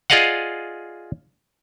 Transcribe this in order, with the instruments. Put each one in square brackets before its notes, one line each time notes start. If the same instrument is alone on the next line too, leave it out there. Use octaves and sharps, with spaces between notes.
[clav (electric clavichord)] F4 G#4 D5 D#5 F5 F#5